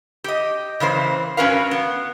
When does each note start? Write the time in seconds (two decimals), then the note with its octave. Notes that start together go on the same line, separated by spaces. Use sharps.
0.24 G4 D#5
0.80 C#3 E3 A#3 C5
1.37 G2 C#4 F#4 A#4 B4 F5
1.71 B3